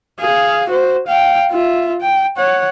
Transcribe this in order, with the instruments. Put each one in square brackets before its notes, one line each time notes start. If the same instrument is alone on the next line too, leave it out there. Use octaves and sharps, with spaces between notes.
[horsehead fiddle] G#4 F5
F#4 C5
F5 G5
F4 E5
G5
C#5 F#5